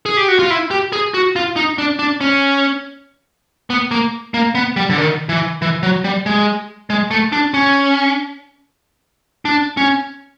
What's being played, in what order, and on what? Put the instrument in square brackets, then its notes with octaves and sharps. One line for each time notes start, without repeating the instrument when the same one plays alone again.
[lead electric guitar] G#4
G4
F#4
F4
E4
G4
G#4
F#4
F4
D#4
D4
D4
C#4
B3
A#3
A#3
B3
G3
D3
D#3
E3
E3
F#3
G3
G#3
G#3
A3
D4
C#4
D4
C#4